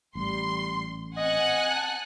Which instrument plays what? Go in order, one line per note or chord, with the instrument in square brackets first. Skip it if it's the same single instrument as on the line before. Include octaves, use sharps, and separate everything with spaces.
[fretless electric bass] A1 [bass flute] G3 [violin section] C6
[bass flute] C4 [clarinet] D#5 [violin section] F#5 G#5 F#6
[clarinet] A5